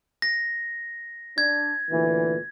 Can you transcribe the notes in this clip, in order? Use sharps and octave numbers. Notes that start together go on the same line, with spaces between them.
A#6
D4 G#6
D2 A#2 E3